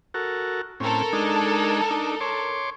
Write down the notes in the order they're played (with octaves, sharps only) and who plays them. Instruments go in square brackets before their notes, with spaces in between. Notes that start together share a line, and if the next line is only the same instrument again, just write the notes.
[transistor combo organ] F#4 A4 A#4
[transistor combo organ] A2 C4 C#4 [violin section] A4 A#4
[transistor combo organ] G#3 D4 D#4
D4 D#4
C#5 C6 D6